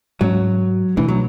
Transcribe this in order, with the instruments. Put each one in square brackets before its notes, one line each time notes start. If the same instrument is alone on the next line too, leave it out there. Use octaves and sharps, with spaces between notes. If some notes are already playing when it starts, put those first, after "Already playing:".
[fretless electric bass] G#2 G#3 C#4 [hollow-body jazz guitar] F#3
[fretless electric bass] B2 A3 D4 [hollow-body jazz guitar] E3
[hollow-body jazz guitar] F#3